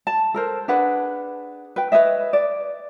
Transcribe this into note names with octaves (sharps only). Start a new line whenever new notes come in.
A5
A4 A#4 C5
D4 G#4 B4 F#5
B4 G5
B4 C#5 D#5 E5
D5